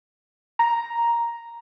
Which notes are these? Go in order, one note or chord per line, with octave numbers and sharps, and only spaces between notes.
A#5